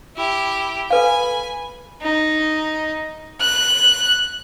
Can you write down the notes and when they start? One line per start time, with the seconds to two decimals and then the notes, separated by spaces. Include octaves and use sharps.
0.16 E4 G4
0.90 A4 B4 F5 G#5 B5
2.02 D#4
3.41 F#6